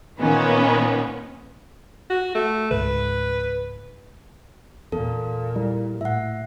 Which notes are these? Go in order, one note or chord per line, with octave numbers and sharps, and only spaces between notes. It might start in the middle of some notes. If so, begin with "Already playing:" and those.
A#2 D#3 B3 C#4
F#4
A3
C#2 G#2 B4
E2 A#2 A4
G3 E4
A2 E5 F#5